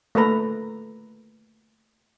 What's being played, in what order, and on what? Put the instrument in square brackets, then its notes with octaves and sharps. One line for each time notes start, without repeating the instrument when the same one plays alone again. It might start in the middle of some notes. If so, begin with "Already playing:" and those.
[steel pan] A3 A#3 A4 B4 A#5